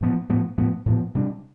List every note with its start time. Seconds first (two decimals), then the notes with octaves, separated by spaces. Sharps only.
0.01 A2 F3 B3
0.29 A2 F3 B3
0.58 A2 F3 B3
0.86 A2 F3 B3
1.15 C3 G3 D4